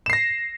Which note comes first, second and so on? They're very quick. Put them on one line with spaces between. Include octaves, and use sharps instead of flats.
E7 C7 A#6